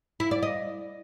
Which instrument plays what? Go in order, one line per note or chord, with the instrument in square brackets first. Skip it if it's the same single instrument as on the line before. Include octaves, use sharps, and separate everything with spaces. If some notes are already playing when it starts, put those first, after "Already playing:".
[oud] E4
D5
D#5